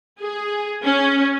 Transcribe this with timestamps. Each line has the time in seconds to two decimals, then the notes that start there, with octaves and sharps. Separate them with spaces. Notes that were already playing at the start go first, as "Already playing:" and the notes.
0.21 G#4
0.83 C#4